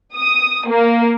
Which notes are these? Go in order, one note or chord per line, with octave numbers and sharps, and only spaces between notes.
D#6
A#3